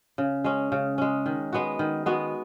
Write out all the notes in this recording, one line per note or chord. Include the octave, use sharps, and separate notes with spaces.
C#3
G#3 C#4
C#3
G#3 C#4
D#3
G#3 B3 F#4
D#3
G#3 B3 F#4